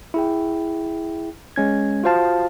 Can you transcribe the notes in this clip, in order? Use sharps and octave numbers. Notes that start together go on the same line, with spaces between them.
E4 G#4 G5
G#3 C#4 G#6
F4 F#4 C5 F5 A5